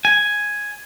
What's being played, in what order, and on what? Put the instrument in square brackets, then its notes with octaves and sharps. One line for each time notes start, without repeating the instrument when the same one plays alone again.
[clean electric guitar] G#5